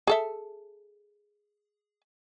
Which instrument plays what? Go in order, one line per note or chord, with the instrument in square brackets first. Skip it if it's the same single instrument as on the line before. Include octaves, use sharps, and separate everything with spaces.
[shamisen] G#4 A4 E5